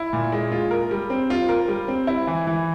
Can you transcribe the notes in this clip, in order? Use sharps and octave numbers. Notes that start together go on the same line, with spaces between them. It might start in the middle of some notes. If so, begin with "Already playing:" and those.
Already playing: E4
A#2
G#3
F4
A#4
G3
C4
F4
A#4
G3
C4
E4
E3
E3